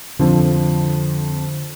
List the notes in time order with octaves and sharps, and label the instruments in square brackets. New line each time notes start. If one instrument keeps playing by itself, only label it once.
[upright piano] F2 F3 [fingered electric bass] D3